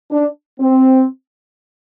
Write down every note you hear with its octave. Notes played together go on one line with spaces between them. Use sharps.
D4
C4